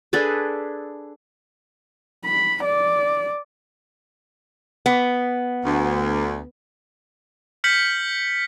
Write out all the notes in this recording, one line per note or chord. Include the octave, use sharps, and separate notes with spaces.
D4 G#4 A4 B4
B5
D5
B3
D2
F6 G6 B6 C#7 F#7